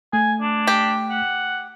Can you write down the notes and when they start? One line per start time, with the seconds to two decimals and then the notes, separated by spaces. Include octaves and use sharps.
0.13 A3 G#5
0.42 D4
0.67 G4
1.10 F#5